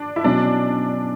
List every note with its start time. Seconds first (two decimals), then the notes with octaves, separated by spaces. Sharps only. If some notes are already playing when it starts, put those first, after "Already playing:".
Already playing: D4
0.16 E4
0.24 B2 F#3 C#4 D4